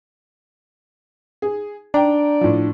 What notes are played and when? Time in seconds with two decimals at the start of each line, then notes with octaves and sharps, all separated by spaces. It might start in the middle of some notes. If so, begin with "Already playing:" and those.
1.42 G#4
1.94 D4 D5 G5 A#5
2.41 A2 F3